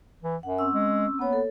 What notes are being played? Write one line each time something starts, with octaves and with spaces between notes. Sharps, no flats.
E3
F#2 F#5
C4 C#4 E6
G#3
A#3 B3 C#5
A4